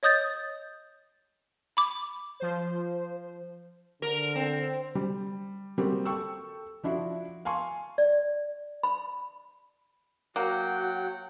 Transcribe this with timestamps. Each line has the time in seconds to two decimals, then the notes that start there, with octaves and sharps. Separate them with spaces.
0.03 C#5 D#5 D#6 G6 A6
1.77 B5 D6
2.40 F3 C5
4.02 D3 A#4
4.35 C4
4.95 G3
5.78 G3 A#3 C4 F#4 G4
6.05 A4 G5 C#6 E6
6.84 F3 D4 E4 F#4
7.45 F5 G#5 A5 C6 C#6
7.98 D5
8.83 B5
10.36 F#3 A#3 F#4 F#5 G5